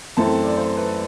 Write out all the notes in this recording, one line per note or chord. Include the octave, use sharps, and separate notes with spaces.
F#2 E3 A3 C4 A5
D5
C5
B4